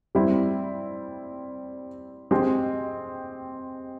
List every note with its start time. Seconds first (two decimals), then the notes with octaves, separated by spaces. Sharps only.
0.15 G3 C4 E4
2.31 G#3 C4 G4